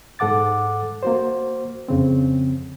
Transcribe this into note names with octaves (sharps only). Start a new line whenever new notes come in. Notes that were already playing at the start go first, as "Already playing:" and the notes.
G#2 A4 F#5 D6 A6
A#3 F#4 C5
F2 C#3 C4